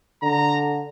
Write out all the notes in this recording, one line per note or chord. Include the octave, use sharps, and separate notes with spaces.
D3 A#5